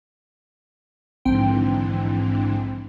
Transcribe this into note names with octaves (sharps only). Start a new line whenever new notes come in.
A#1 G#2 D3 E3 C4 G5